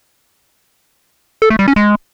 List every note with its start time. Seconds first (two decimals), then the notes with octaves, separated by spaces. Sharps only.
1.42 A4
1.50 A3
1.59 G3
1.68 C#4
1.76 G#3